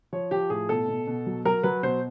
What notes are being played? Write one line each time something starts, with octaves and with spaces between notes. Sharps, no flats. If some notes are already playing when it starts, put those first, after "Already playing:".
F3 C#5
F3 G4
A2 G#4
B2 A4
B2
B2
F#3
F#3 A#4
F#3 B4
B2 C5